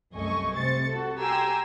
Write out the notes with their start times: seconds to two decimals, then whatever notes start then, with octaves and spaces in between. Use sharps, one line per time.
0.15 C2 F#2 A3 D#5 G#5 C#6
0.56 C3 C5 A6 C#7
0.90 F#4 A4
1.20 G4 G5 G#5 A#5 C6 E6